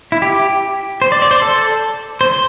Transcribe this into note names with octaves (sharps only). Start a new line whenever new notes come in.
E4
G4
C5
D5
D5
C5
A4
C5